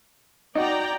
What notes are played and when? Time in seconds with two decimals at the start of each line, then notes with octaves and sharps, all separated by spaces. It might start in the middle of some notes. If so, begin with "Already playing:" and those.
0.55 D#4 F#4 D5 G5 A#5